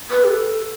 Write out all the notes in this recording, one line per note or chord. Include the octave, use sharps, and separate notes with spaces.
B4
G4
A4